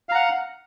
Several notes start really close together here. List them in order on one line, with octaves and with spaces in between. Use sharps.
F5 A#5 F#5